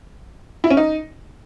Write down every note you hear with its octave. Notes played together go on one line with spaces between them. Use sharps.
E4
C#4
D#4